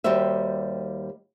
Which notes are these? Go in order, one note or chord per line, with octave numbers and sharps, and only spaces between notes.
D#2 G3 F#4 G4 C5 E5